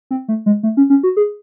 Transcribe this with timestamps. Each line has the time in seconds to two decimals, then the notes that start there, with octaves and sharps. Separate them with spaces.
0.11 C4
0.28 A3
0.46 G#3
0.63 A3
0.77 C#4
0.90 C#4
1.03 F#4
1.17 G#4